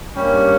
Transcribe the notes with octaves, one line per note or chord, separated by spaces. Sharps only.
G2 G3 A#3 C#4